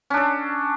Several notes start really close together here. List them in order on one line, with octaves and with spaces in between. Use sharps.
C#4 D4 A4